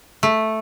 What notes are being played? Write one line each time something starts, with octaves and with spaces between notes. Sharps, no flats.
A3